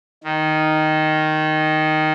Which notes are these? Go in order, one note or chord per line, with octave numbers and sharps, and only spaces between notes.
D#3